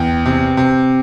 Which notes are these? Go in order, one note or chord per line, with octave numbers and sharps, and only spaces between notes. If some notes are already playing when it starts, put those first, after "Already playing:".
Already playing: E2 G5
C3
C3